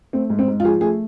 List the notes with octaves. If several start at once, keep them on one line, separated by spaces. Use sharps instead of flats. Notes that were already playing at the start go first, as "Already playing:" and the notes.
A3 C4
G#2
C4
G#2
F4
F3 G#4
A3 G#4